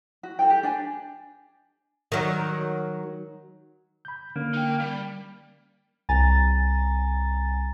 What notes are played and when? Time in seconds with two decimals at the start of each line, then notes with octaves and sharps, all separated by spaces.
0.23 F#4
0.39 F#4 A4 G5
0.50 G4
0.63 D4 D5 G#5
2.12 D#3 F#3
4.05 B5 G6
4.36 D3 A#3 C#4
4.54 D#4 G5
4.80 G3
6.09 C2 G#5 A#5 A6